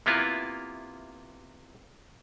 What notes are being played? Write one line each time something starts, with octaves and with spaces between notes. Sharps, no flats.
C3 A#3 B3 E4 F4